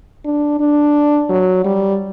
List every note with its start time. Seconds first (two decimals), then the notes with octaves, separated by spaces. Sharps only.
0.25 D4
0.59 D4
1.29 F#3
1.64 G3